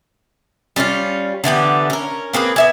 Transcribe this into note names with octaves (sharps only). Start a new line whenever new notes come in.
G3 C#4 D#4 F4
D3 E3 B3 G4
C#4 A#4
A#3 C4 G#4 B4
B3 E5 G#5